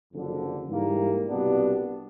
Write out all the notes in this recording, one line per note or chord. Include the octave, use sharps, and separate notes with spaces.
F#1 F2 D3
G#2 E3 G3 A#3
C2 B2 G3 B3 D4